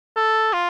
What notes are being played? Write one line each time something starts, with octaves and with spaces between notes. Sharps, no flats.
A4
F4